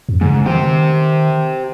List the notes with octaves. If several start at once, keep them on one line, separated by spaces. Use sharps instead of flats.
F2
G#2 C#3
D#3 G4 C5